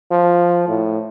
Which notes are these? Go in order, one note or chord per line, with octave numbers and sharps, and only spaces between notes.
F3
A2